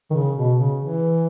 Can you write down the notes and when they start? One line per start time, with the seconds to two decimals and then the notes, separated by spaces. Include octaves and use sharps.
0.11 D#3
0.15 C#3
0.37 B2
0.58 C#3
0.80 E3